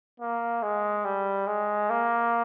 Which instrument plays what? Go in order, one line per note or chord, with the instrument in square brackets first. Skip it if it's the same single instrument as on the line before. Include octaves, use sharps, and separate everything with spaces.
[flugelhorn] A#3
G#3
G3
G#3
A#3